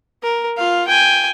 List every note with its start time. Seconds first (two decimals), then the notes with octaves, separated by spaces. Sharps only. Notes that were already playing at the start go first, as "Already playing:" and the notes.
0.23 A#4
0.57 F4 F5
0.88 G5 G#5